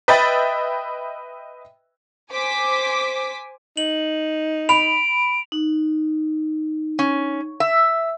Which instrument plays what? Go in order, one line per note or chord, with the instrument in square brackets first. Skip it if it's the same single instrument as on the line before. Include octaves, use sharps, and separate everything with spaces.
[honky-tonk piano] B4 D#5 E5 G5 B5 A6
[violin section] C5 G#5 D6 B6
[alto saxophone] D#4 [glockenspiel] F#7
[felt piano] B5 [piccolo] D7 [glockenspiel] F7
[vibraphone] D#4
[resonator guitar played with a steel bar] C#4
E5